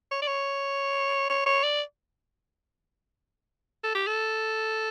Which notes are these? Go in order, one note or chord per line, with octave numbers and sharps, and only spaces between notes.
C#5
D5
C#5
C#5
C#5
D5
A4
G4
A4